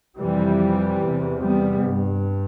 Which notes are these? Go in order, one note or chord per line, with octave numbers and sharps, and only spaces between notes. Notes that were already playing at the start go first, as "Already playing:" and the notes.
F2 C3 E3 G3
E2 C3
G3 B3
G2